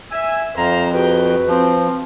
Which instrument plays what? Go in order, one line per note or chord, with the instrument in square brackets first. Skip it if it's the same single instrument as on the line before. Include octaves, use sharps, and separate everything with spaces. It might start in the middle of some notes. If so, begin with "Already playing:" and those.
[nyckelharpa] E5 [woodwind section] G#5 E6
[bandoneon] F2 [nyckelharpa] C5 [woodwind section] F5 A#5
[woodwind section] F#4 B4 [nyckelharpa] G#4 G5
[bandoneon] F3 [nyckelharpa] C4